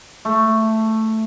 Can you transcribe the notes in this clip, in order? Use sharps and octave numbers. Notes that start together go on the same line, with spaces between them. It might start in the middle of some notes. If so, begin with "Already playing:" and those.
A3